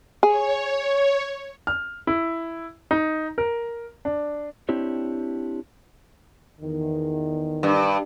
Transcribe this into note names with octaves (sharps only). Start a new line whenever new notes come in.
G#4 C#5
F6
E4
D#4
A#4
D4
C4 D4 E4 G4 C#5
E2 D#3
G2